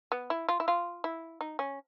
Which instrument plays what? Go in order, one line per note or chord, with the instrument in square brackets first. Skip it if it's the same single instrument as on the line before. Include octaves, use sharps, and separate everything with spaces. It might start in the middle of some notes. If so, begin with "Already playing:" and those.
[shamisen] B3
E4
F4
E4
F4
E4
D#4
C#4